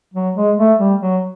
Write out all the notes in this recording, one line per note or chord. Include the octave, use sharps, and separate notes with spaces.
F#3
G#3
A3
G3
F#3